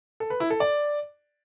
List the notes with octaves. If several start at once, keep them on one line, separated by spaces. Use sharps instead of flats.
A4
B4
E4
A4
D5